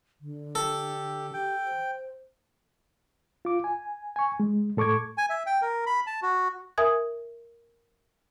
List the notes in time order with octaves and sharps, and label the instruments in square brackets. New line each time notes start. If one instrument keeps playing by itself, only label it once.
[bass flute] D3
[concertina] G4 [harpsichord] A4
[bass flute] G4 [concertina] G5
[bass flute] C5
[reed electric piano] F4 D6
G#5
G#5 C#6
G#3
A2 A4 C#6 D6 G#6
[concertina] G#5
E5
G5
A#4
B5
A5
F#4
[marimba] A#4 E5 G#5 D#6 G#6